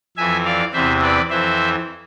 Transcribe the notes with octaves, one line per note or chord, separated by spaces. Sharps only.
F2 E3 E5 G#5
D5 F5
E2 C3 E3 C5 E5
B4 D5
F2 E3 C5 E5